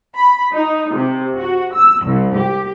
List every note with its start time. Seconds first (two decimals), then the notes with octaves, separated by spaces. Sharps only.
0.15 B5
0.53 D#4
0.94 C3
1.37 F#4
1.75 E6
2.05 C2
2.38 G4